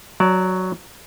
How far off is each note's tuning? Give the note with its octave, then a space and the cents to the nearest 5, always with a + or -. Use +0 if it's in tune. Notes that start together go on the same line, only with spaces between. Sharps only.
F#3 +0 D5 -15 A5 +0